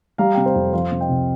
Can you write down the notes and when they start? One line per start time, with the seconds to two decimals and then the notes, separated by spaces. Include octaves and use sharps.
0.18 G3 F5 A#5
0.34 C3 G5
0.46 C5 F5
0.55 F2
0.73 F3 C5 F5
0.91 C3
1.00 D#5 G5
1.09 C2